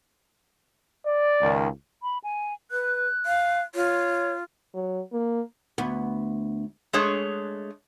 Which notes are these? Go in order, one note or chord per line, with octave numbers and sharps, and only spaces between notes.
D5
C#2 D#3
B5
G#5
B4 F#6
F5
F4 C#5
F#3
A#3
D2 B3
G#3 A3 D4 G#4 C#5